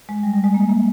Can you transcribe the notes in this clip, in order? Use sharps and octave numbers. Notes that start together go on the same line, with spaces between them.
G#3
G3
G3
G#3
A#3
A#3